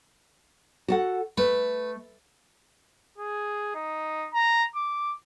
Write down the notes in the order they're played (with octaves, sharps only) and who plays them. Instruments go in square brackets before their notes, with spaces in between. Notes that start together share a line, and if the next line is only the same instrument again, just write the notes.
[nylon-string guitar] F#4 A4 F#5
[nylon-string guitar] A3 [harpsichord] B4
[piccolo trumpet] G#4
D#4
A#5
D6